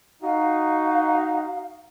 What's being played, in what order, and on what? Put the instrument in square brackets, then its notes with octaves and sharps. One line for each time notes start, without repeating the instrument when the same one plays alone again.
[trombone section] D#4 F#4 [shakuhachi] F5